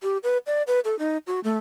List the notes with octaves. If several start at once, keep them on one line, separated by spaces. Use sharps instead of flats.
G4
B4
D5
B4
A4
D#4
F#4
A3